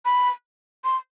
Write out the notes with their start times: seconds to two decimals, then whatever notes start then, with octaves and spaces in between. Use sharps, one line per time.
0.05 B5
0.84 C6